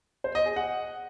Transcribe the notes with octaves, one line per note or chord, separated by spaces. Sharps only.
C5
D#5
G#4
F#5